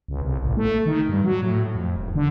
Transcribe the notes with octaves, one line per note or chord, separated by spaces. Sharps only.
C#2
C2
A1
A3
D#3
G2
F#3
A2
F2
E1
D3